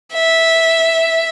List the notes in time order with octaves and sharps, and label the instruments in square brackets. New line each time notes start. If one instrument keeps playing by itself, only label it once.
[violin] E5